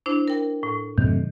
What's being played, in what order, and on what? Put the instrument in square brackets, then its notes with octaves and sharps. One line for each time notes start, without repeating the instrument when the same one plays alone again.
[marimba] D4 E4 C5
A#4 G5
A2
[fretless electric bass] F#2 A2 C3 [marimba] D#3